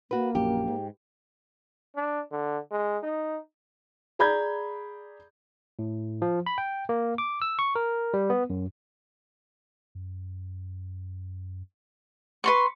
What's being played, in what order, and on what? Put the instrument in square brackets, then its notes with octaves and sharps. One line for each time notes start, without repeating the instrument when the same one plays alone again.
[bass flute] A#3 [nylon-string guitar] F#4 B4
[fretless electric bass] A#1 F#2 [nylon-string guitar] G4
[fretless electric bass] G#2
[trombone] D4
D3
G#3
D#4
[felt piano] G#4 D5 A#5 B5 G6 G#6
[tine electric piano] A2
F3
B5
G5
A#3
D6
E6
C#6
A#4
G3
B3
F#2
[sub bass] F#2
[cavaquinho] B4 C6 C#6